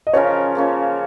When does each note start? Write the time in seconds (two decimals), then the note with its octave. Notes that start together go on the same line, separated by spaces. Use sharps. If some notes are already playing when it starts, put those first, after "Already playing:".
0.07 D#5
0.13 C#3 F3 C#4 A#4 C#5
0.55 C#3 A#3 C#4 F4